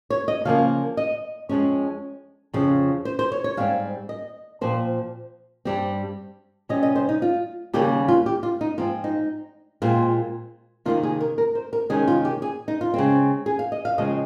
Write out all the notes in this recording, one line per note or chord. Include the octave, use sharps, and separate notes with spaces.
C#5
D#5
C#3 F3 A#3 F5
D#5
F2 C#3 F3 G#3 C#4 C#5
F2 C#3 F3
C5
C5
C#5
C#5
G#2 G3 C4 F5
D#5
A#2 F3 C4 C5
G2 G3 C4
C3 G3 C#4 D#5
D#5
C5
D#4
F4
D#2 C#3 G3 A#3 C#4 G4
F4
G4
F4
D#4
G#2 F3 C4 F4
D#4
A#2 G#3 C4 F4
C3 D#3 G3 A#3 F4
G#4
A#4
A#4
C5
A#4
C3 D#3 G#3 C#4 G#4
F4
G4
G#4
D#4
F4
C#3 G#3 C4
G#4
F5
D#5
F5
C#3 F3 G#3 C4 D#5